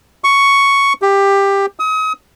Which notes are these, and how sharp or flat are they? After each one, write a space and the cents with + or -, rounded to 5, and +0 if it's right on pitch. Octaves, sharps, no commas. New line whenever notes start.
C#6 +5
G4 +15
D#6 +35